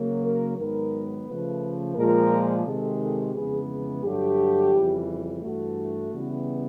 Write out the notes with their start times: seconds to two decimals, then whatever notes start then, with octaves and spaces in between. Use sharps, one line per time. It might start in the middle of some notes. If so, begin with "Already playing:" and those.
Already playing: C#3 F#3 A#3
0.23 A#4
0.57 G#2 D#3 F#3 B3 A#4
1.27 C#3 F3 A3 B4
1.95 A#2 F3 G#3 A#4
2.65 C3 D#3 G#3 A4
3.00 A4
3.34 F2 C#3 E3 G#3 B3 G#4
3.69 G#4
4.03 G2 D3 F#3 A3 G4
4.73 F2 C#3 E3 G3
5.42 G2 E3 A3 F#4
6.12 C#3 E3 G3 B3